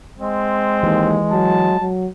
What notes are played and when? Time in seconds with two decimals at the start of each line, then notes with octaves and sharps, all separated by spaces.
0.19 G#3 C4
0.83 D#2 E3
1.32 F#3 A5
1.80 F#3